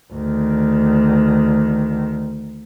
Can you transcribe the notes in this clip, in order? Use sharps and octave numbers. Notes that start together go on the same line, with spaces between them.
D2 D#3